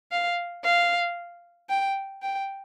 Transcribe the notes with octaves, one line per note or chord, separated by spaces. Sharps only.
F5
F5
G5
G5